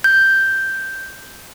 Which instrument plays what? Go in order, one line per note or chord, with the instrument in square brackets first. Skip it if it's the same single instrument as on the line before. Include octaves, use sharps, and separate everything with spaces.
[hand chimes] G6